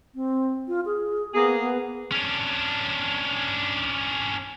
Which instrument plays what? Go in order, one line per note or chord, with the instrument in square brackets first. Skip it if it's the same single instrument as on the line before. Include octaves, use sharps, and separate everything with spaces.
[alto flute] C4
F4
G#4
[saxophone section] A#3 G#4 [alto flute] B3
[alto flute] B3
[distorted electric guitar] C#4 D4